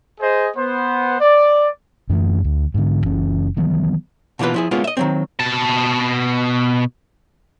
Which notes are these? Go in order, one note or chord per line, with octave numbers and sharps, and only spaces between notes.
G#4 C5 D#5
B3 C5
D5
F#2 E3 A3
D2
G#2 D3
F#1 E3 C#4
D#3 E3 F#3 B3
B2 E3 A#3 F4 B4
F3 E4 G#4
G#3 A#3 B3 C#4 F4
D#5 E5
D#3 F#3 C4
B2 A5